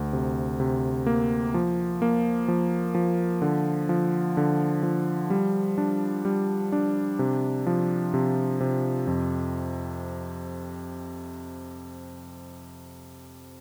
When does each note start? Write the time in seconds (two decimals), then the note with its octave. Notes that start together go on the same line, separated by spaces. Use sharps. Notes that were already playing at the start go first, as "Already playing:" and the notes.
Already playing: D2
0.13 C3
0.60 C3
1.06 A#3
1.54 F3
2.02 A#3
2.48 F3
2.95 F3
3.42 D3
3.89 F3
4.37 D3
4.83 F3
5.30 G3
5.78 D4
6.25 G3
6.72 D4
7.19 C3
7.67 F3
8.14 C3
8.60 C3
9.07 F2